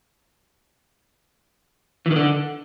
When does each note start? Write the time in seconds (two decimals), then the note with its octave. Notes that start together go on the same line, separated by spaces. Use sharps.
2.06 E3
2.11 D#3
2.16 D3